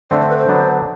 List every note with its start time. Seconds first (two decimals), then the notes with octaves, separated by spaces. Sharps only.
0.11 D3 A3 C4 D5
0.20 C5
0.29 B4
0.38 C5
0.48 D3 F#3 B3 D4